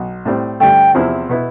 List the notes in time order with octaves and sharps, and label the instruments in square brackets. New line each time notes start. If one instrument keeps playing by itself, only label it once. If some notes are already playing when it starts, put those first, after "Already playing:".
Already playing: [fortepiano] B1 B2
A2 G3 C4
[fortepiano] G2 D3 A3 [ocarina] G5
[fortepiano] E2 C3 F3 C4 E4
B2 B3 E4